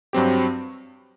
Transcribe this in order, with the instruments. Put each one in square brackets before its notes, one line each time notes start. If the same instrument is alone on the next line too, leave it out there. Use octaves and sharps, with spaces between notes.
[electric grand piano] G2 F#3 C4 G4